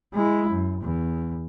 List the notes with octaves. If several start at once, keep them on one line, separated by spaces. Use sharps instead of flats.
G#3 E4
F#2
E2